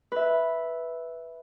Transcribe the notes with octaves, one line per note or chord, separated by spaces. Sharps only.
B4 E5